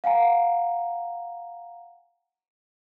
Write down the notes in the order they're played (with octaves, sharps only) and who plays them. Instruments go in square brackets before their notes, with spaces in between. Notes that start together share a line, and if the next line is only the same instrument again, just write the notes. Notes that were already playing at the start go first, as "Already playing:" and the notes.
[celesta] F5 F#5 G#5 A#5